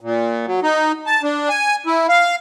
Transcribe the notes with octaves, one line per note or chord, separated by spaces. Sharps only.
A#2
F#3
D#4
A5
D4
G#5
E4
F5